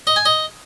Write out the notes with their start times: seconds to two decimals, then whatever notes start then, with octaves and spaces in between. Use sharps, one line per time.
0.07 D#5
0.16 G#5
0.26 D#5